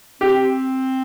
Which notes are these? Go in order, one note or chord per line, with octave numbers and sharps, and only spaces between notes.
C4 G4